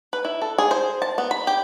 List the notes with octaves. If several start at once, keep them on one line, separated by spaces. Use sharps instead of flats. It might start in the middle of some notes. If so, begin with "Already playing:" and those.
B4
E4
A4
G#4
C5
A5
B3
B5
G4